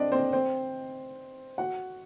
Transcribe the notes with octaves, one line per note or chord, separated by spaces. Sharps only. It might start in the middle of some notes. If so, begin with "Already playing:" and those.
Already playing: C4 D4 D5 D#5
C4 C5
C4 C5
F#4 F#5